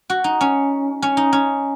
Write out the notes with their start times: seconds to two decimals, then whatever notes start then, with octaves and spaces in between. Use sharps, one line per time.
0.10 F#4
0.24 D#4
0.41 C#4
1.02 C#4
1.17 D#4
1.33 C#4